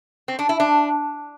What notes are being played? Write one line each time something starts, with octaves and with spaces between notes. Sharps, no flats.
C4
D4
E4
D4